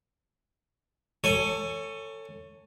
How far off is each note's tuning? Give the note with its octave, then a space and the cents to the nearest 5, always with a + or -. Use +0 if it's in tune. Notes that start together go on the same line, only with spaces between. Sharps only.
A4 +25 C#5 +0 G#5 +0